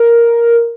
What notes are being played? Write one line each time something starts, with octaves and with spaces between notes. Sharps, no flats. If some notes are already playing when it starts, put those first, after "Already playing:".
Already playing: A#4